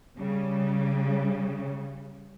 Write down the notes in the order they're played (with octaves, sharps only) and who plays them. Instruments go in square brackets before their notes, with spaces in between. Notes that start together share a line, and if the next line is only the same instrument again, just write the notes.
[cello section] C#3 G3